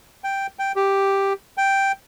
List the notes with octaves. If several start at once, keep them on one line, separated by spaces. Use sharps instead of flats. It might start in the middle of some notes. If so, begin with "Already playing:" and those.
G5
G5
G4
G5